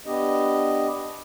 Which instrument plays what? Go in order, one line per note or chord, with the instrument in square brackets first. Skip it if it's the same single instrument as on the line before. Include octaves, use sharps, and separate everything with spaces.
[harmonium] B3 D4 G4 D#5